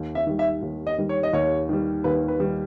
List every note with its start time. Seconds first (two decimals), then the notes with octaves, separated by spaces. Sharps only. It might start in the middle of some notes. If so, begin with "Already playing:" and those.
Already playing: D#2
0.15 E5
0.27 D#3 G3
0.39 E5
0.62 D#2
0.87 D#5
0.98 D#3 G3
1.09 C#5
1.23 D#5
1.33 D#2 C#5
1.69 D#3 G3
2.04 D#2 B4
2.28 B4
2.40 D#3 G3